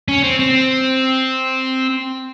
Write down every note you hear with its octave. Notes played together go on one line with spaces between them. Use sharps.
C#4
C4
C4